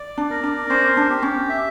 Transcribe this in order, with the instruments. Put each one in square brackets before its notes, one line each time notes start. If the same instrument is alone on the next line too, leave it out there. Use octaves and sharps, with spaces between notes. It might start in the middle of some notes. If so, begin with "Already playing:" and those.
Already playing: [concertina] D5
[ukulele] D4
[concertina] A#4
[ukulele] D4
[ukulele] C#4 [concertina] C5
[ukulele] D4
[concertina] G4
[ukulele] C#4
[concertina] E5